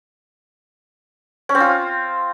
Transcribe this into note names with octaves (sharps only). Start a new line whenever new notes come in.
C#4
C4
F4